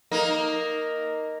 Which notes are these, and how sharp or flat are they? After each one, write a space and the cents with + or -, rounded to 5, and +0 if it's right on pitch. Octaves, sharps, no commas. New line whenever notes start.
A#3 +0 D#4 +0